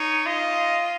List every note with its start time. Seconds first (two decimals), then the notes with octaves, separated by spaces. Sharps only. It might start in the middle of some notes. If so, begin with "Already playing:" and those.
Already playing: D#4 C#5
0.26 F4 D#5